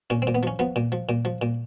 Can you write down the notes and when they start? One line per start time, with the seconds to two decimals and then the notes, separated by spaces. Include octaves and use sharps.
0.10 A#2 C#4
0.22 C4
0.27 A#2
0.35 B3
0.43 F3 C#4
0.59 F3 B3
0.76 A#2
0.92 F3
1.09 A#2
1.25 F3
1.42 A#2